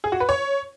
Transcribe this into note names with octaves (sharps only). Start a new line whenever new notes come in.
G#4
F#4
B4
C#5